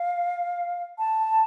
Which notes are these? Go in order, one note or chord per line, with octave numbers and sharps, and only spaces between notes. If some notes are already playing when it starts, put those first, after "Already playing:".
Already playing: F5
A5